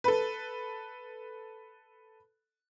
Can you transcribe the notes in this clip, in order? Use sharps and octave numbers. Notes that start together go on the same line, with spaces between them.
A4 B4